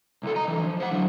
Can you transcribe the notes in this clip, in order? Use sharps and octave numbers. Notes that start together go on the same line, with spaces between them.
C2 A4
D#5 A#5
D3 E3
F3
C5 F#5
D3 F#3